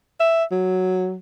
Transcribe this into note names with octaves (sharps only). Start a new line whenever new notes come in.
E5
F#3